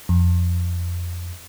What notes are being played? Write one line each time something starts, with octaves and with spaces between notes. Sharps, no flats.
F2